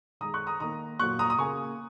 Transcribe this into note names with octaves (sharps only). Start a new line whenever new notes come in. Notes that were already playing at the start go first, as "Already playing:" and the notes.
D#3 G#3 A#5 D#6
C#6 F#6
A#5 D#6
D#3 A#3 A#5 D#6
A#2 F#3 A#3 C#6 F#6
A#5 D#6
D#6
C#3 A#3 G#5 C#6